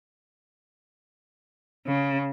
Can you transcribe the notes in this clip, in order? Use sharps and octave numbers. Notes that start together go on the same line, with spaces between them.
C#3